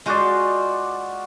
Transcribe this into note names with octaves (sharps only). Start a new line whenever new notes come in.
G#3 F4 F#4 C5 D5